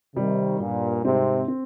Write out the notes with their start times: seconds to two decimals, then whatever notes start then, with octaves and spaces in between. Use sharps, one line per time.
0.16 C3 D#3 G3
0.60 G2 A#2 G3
1.05 G#2 C3 C4
1.48 C4